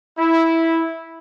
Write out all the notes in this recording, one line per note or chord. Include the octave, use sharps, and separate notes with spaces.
E4